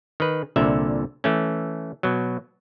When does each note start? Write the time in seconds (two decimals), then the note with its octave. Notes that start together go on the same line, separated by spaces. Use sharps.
0.20 D#3 B4
0.56 C2 A#2 D3 E5
1.24 E3 A3 C#4
2.03 B2 F#3